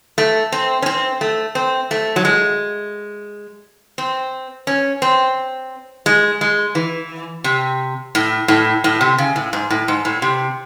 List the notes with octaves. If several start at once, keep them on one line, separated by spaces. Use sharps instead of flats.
A3
C4
C#4
C4
A3
C4
A3
F#3
G#3
C4
C#4
C4
G#3
G#3
E3
C3
A2
A2
A2
C3
C#3
A2
G#2
A2
G#2
A2
C3